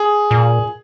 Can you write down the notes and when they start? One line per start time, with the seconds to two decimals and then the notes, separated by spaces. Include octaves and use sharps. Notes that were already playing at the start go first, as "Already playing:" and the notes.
Already playing: G#4
0.31 A#2